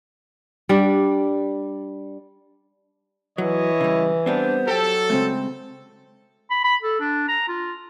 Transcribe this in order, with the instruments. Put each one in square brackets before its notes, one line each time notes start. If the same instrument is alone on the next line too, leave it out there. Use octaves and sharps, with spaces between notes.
[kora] G3 D4 F#5
[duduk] E3 [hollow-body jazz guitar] F#3 [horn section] E4 C#5 D#5
[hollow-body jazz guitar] C#3 G3
[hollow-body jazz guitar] G3 B3 C4 [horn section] D4 [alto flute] C5
[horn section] F#3 A4 [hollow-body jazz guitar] G4 G5
[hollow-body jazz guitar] C#3 G#3 A3 [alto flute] C4
[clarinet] B5
B5
A4
D4
A#5
F4